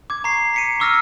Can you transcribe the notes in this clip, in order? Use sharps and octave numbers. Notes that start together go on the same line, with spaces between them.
D6 G#6
A#5 C#6 C7
B6 C#7 D#7
C#6 D6 E6 F6 A#6